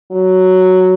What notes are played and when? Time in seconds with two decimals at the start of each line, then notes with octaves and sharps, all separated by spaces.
0.12 F#3